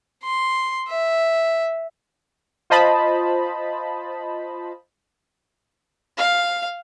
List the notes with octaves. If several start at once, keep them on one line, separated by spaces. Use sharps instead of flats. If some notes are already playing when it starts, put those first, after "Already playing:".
C6
E5
F4 C5 D#5 A5 B5
F5